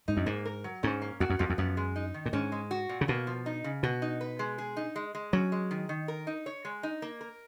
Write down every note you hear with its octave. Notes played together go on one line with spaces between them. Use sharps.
G#2 D#4
F#2
G#2 A#3
A#4
F#3
G#2 C#4
A#3
F2 F#4
F#2
F2 F3
F2
F#2 B3
G#3
D#4
D#3
A#2
G#2 C#4
G#3
F#4
A#2
C#3
B2 A#3
F3
D#4
C#3
B2 F#4
D#4
B4
G#3
G#4
D#4
G#3
G#3
F#3 C#4
G#3
D#3
D#3
A#4
D#4
C#5
G#3
D#4
A#3
A#4